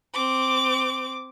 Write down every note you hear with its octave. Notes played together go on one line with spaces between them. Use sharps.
C4 D6